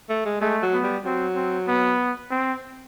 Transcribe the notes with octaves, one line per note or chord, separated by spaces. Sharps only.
A3
G#3
G#3 A3
F#3
B3
G3
F#3 C4
C4
B3
C4